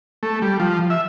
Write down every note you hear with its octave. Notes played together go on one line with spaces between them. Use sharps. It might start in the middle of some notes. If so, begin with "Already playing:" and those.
A3
G3
F3
E5